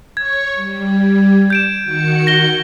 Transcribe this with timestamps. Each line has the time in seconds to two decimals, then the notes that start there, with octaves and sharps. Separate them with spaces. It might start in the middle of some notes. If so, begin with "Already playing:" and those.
0.17 C#5 C#6 G#6
0.54 G3
1.50 G6 D7 E7
1.84 D#3 F#4 C#7
2.27 A#6 G7